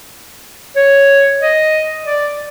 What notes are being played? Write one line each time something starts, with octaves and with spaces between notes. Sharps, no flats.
C#5
D#5
D5